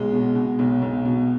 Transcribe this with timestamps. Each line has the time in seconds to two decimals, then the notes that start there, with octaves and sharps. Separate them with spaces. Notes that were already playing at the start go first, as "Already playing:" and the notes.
Already playing: B1 G#3
0.13 B2
0.35 B2
0.59 B1
0.82 B1
1.05 B2